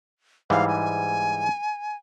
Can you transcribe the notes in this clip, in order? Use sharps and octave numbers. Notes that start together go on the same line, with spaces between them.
G#2 E3 G3 F5
G#5